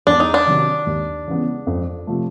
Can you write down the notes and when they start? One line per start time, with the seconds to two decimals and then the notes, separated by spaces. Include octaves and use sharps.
0.07 E2 D4
0.20 D#4
0.34 D4
0.47 C3 D#3 F#3
0.87 D#2
1.27 C#3 E3 G#3 B3
1.67 F2
2.07 C3 F3 A3